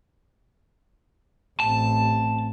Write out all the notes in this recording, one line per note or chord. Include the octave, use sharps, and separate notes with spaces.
A1 C4 A5